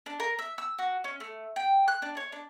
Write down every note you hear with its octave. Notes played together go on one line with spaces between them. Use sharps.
D4
A#4
E5
E6
F#4
C#4
A3
G5
F#6
D4
C#5
D4